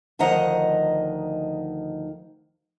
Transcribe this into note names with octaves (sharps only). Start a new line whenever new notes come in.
D2 D#3 F3 D#5 F#5 A#5